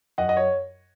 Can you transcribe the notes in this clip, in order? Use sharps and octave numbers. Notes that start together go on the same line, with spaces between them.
F#2 D#5 F#5
D#5
C#5